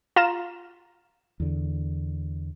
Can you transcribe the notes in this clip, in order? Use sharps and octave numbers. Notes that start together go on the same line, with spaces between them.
F4 A#5 E7
E2 D3